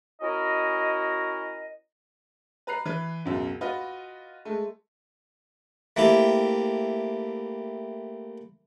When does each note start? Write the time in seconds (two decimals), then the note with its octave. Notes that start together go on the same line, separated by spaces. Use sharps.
0.21 C#4 E4 F#4 A#4 D#5
2.67 B4 A#5 F#6 C7
2.85 E3 B4
3.25 C#2 F#2 B2
3.61 F4 F#4 B4 D#5
4.45 G#3 A3
5.96 A3 A#3 C4 E4 G4